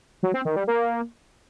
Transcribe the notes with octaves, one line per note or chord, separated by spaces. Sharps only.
F#3
C4
D#3
G3
A#3